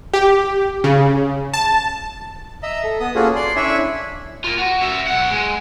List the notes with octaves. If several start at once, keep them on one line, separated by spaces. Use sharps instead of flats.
G4
C#3
A5
D#5 E5 A#5
A4
B3 D#6
A#3 C#4 F4 F#4 G#4 A4
D5 C6
C#4 D4 E4 E5 G#5 C#6
F4 A#4
F#4
C#4 E5
B1 F#5
G#3